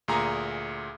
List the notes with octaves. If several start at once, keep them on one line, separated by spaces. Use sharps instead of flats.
D2 A#2 G#4 G#5 A#5